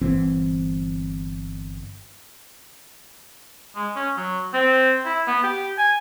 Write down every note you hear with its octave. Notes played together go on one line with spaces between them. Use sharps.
G1 E3 C4
G#3
C#4
F#3
C4
E4
B3
G4
G#5